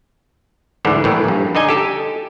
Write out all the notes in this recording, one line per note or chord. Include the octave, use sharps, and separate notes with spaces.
D2 G#2 D3 E3
A#1 A2 E3
A#1 G2
D3 D#4 D#5 G#5
G4 A4